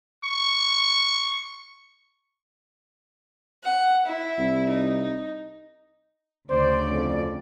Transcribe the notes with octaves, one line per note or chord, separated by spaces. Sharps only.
C#6
F#5
E4
C2
D#4
D2 C#3 C5 D5
F2